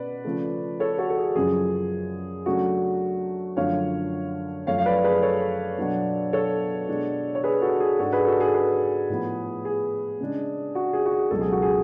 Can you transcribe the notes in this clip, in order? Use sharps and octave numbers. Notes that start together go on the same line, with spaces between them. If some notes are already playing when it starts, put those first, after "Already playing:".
Already playing: B2 C#4 B4 D5
C#3 F3 A3
A4 C#5
F#4 A4
A4
G#4
F#2 C#3 F3 G#4
C#3 F#3 A3 D4 F#4
F#2 D3 F3 A3 C#5 F5
F#2 F3 A3 C#5 F5
F5
B4 D5
G#4 B4
A4 C#5
B2 F#3 B3 D4
A4 C#5
B2 G#3 D4
C#5
G#4 B4
F#4 A4
G#4
G#2 G#3 D4 F#4 A4
G#4 B4
F#4 A4
G#4
G#4 B4
A2 F3 B3
G#4
C#3 G#3 D4
F#4
G#4
F#4
G#4
C#2 B2 F#3 A4
G#4
F#4
G#4